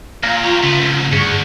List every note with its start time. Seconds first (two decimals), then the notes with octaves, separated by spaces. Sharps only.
0.23 A#2 F5 A#5
0.43 F4 G4 C#5
0.63 C#3 A3 B3
0.82 F2 G#2
1.12 D2 G2 G#4 C#6